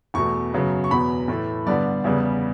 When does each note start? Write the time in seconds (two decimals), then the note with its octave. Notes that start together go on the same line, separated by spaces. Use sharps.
0.14 E2 B2 A3 C#6
0.52 F#2 C#3 F#3 B3
0.84 C#6
0.91 E2 B2 F#3 B3 B5
1.28 A2 E3 A3
1.66 G2 D3 G3 B3 D5
2.04 E2 C#3 G3 B3